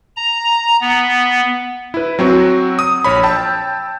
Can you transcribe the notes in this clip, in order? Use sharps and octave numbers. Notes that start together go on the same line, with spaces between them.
A#5
B3
E4 B4
F#3 C4 F#4
D#6
A#1 C#5 B5
G5 A5 E6